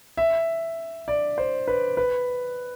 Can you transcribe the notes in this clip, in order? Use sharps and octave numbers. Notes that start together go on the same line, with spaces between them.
E5
D5
C5
B4
B4